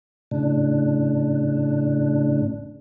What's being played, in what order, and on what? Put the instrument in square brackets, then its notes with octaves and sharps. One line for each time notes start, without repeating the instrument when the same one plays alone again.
[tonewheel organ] A2 C#3 D4